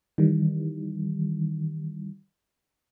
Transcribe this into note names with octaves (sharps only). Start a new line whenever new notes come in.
D#3 E3 G3